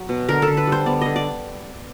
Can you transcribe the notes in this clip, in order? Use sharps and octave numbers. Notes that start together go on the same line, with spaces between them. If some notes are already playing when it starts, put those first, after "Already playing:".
Already playing: F#3
B2
D3 A#4
A4
D3
B4
G3 C5
B3 D5
D3 D#5
D5